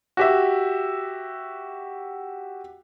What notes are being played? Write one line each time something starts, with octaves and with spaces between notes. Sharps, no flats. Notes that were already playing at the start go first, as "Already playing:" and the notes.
F#4 G4 E5